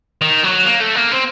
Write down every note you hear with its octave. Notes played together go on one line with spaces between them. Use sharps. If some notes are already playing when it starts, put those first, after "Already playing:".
D#3
F#3
A#3
A3
A#3
C4